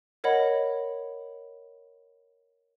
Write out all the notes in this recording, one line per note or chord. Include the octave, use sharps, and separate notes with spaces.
A#4 C#5 D#5 F#5 B5